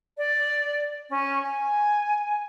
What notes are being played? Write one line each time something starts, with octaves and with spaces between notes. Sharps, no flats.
D5
C#4
G#5